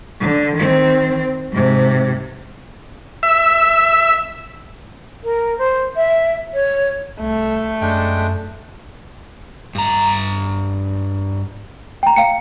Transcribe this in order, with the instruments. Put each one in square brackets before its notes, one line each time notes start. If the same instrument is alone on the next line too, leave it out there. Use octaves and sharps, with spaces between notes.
[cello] D3
D#3 C4
G#2 C3
[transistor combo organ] E5
[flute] A#4
C5
E5
C#5
[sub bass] C2 [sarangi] A3
[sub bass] F#2 [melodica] G#3 D4 G5
[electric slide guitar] G2 A#5
[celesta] G5 A#5
F5 G5 C#7